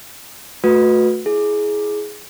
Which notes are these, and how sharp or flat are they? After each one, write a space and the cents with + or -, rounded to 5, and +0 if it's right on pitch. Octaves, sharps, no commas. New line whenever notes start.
A3 +0 F#4 -25 B4 +0
E4 +0 G#4 +10